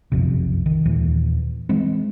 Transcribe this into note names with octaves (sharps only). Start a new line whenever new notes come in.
F#1 B1 F2 C3
D#3
D#2 A#2 E3
E3 G#3 C4